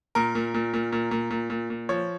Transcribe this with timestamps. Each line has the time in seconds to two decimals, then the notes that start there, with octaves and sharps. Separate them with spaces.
0.15 A#2 A#4
0.35 A#2
0.54 A#2
0.74 A#2
0.92 A#2
1.11 A#2
1.31 A#2
1.50 A#2
1.70 A#2
1.89 F3 C#5